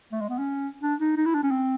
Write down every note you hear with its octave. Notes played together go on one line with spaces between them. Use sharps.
A3
G#3
B3
C#4
D4
D#4
D#4
E4
D4
C#4
C4